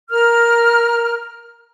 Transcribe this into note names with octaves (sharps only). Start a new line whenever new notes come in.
A#4 F6